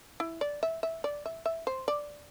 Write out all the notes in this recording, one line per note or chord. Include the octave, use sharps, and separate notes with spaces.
E4
D5
E5
E5
D5
E5
E5
C5
D5